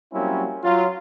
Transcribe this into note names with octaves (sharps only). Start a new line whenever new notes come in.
F#3 G3 A#3 C4 C#4 E4
F#3 F4